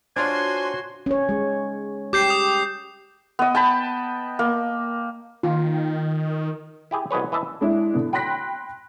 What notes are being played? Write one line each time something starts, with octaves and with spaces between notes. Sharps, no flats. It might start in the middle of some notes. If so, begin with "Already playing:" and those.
D4 F4 F#4 C5 C#5 G#5 C6
C#4 C#5
G#3
G4 D6 G6 C7
D#6
B3 D#5
G5 A5 B5
A#3
D#3 F4
E4 G4 G#4
C2 B2 G#4 B4 C#5
E3 D#5 E5 A5
G#3 D4 E4
D3 B3
G5 B5 C6 F#6 A#6 B6